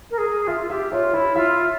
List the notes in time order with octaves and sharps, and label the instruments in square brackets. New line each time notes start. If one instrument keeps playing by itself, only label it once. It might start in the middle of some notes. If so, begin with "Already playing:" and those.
[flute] A#4
G#4
[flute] F4 [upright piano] E5
[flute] F4
[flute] G4 [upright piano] E5
[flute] F4 [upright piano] C#5
[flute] E4 [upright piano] C#5
[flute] F4 [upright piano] E5